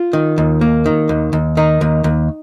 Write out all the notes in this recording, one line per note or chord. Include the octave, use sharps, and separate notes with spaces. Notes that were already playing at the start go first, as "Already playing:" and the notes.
Already playing: F4
D#3
D#2
A#3
D#3
D#2
D#2
D#3 D#4
D#2
D#2